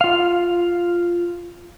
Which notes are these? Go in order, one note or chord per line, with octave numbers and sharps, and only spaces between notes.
F4 F5